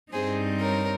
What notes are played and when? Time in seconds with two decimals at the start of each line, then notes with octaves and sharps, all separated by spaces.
0.13 G2 G3 C4 D#4 G#4 C5
0.60 A#4 C#5